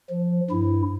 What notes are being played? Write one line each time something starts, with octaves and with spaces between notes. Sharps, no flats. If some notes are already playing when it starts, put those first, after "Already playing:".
F3
G2 E4